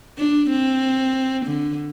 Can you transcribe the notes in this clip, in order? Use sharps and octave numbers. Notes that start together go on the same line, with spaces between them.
D4
C4
D3